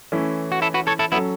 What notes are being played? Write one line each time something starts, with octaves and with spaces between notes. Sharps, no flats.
E3 A3 C#4 E4
F#4
E4 A4
F#4 B4
A4 C#5
E4 A4
F#3 B3 C#4 E4 A4